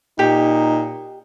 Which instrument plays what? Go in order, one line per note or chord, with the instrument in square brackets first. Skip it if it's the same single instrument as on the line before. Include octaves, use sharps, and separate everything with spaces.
[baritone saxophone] A#2 [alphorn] D#4 [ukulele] G4